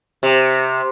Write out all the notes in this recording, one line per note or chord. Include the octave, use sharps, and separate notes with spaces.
C3